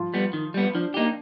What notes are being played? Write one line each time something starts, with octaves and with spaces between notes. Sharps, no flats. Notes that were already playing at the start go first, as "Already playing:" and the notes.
Already playing: F3 F4
G3 B3
D#3
G3 B3
F3 D4
A#3 D#4 G4